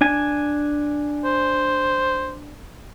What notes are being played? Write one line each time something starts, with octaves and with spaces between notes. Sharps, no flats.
D4 G#5
C5